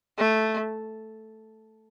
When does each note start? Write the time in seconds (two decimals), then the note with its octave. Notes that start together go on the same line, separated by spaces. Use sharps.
0.18 A3